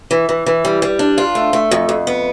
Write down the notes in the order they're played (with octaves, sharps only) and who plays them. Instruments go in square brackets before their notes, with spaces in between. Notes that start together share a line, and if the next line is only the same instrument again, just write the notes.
[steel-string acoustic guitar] E3
E3
E3
G3
G3
D4
F4
A3
A3
F2
F2
B3